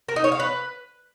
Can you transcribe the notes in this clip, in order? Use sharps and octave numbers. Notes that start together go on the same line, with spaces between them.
A#4
D#4
C#5
F5
B4